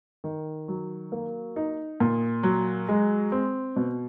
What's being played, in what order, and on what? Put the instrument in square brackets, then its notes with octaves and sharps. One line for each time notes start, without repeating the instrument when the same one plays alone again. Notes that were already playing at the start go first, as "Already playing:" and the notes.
[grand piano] D#3
F#3
A#3
D#4
A#2
F#3
G#3
C4
B2